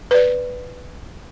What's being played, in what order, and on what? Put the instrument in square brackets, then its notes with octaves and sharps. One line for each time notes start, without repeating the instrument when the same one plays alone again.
[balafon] B4 D5